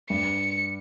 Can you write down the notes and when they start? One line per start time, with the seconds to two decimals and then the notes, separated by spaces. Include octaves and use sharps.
0.10 G2 C#7